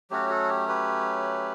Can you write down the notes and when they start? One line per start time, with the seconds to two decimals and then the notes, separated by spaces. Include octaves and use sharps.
0.10 F#3 A3 C#4 F#4 G4
0.30 F#4 A4
0.49 G4
0.68 G4 B4